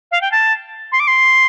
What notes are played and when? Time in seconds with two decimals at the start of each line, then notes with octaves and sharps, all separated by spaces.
0.12 F5
0.21 G5
0.32 A5
0.92 C6
1.00 D6
1.07 C6